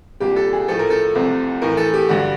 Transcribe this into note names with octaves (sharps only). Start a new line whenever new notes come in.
C2 A#2 G3 G4
A4
G#4
A2 F3 A3 A4
A#4
A4
C2 C3 F3 A3
A2 E3 A3 A#4
A4
G4
G2 D3 G3 F#4